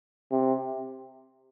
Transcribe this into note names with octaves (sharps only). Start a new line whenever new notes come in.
C3